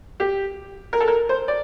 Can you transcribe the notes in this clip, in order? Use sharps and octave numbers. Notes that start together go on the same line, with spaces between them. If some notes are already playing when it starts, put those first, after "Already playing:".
G4
A#4
A4
A#4
C5
D5